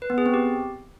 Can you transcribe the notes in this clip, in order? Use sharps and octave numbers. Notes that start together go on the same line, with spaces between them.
B4
B3
G#4
C4
G4